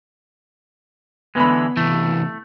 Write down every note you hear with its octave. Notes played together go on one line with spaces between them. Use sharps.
D3 E3 G#3 B3 B5
C3 E3 A3